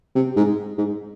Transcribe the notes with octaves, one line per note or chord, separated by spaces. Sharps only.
C3
G#2
G#2